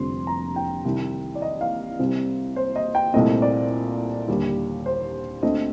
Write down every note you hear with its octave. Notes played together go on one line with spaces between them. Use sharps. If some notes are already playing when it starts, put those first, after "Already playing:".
Already playing: F1 F2 D3 G3 C4 C6
A#5
G5
C2 C3 D#3
D5
D#5
F5
C2 C3 G3 C4
C5
D#5
G5
C2 A#2 A3 C4 D#5
D5
D#2 D3 G3
C5
D2 D3 A3 C4 D#5